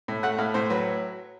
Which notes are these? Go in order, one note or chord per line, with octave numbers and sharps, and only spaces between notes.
A2
A3 F#5
A2 F5
A2 C5
F#3 B4